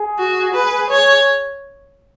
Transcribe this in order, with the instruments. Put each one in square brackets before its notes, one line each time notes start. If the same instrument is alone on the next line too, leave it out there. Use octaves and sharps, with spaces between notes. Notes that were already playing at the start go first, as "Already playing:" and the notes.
Already playing: [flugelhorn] G#4
[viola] F#4
B4
C#5